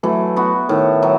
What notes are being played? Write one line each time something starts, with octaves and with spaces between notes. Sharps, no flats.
E3 F#3 A3
B3 F#4
A2 D#3
F#3